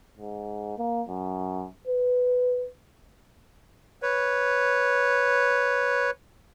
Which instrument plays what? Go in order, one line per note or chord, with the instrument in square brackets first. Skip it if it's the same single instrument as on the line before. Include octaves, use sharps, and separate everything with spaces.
[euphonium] G#2
A#3
F#2
B4
[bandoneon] B4 C#5